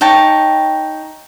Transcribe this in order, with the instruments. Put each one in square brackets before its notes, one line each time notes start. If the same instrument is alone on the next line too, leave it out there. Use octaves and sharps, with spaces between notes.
[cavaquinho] D#4 C#5 G5 A5